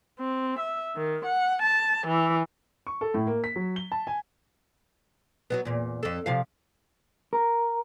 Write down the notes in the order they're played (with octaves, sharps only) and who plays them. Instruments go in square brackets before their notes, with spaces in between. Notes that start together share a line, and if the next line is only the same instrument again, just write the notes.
[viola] C4
E5
D#3
F#5
A5
E3
[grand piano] C#6
A4
A2
A#3
B6
F#3
G7
A5
G#5
[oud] F#3 G3 B3
E2 A#2
F2 A4
C3 F3 F5
[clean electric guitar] A#4